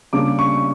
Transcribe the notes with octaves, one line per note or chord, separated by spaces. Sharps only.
C#3 G3 A#3 D4 D6
C#6